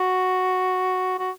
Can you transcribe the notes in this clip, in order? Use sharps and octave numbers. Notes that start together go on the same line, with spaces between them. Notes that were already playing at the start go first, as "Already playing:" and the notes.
Already playing: F#4
F#4